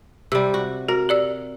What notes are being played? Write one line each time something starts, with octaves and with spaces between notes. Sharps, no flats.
C3 G3 E6
F#4
F#4 A#4
G4 D5 E6